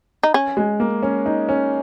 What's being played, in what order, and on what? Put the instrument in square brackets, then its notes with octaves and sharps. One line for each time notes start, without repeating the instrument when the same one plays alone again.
[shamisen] D#4
C#4
[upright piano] G#3
A#3
C#4
D#4
C#4